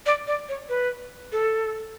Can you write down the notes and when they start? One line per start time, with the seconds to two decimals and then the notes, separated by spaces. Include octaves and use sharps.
0.06 D5
0.27 D5
0.49 C#5
0.69 B4
1.32 A4